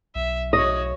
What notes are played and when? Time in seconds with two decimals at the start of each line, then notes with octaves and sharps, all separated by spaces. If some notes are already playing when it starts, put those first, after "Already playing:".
0.15 B1 E5
0.53 F#4 C#5 D#5